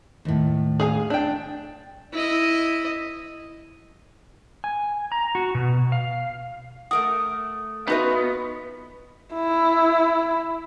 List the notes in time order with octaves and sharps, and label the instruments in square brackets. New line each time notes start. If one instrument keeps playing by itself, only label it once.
[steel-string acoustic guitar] D#2 A2
[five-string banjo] G#4 F5 G#5
D4 G5
[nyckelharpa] E4 D#5
[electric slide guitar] G#5
A#5
F#4
B2
F5
[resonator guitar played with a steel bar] A3 A#4 F#5 [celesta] D#6
[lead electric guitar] B3 [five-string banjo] D#4 F#4 B4 [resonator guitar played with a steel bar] F4 D#5 E5
[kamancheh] E4